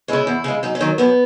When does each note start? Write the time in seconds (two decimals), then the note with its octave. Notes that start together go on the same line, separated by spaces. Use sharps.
0.08 C#3 G#3 E4
0.27 E2
0.44 C#3 G#3
0.63 F#2 D#4
0.75 C#4
0.80 D#3 F#3
0.98 F#2 B3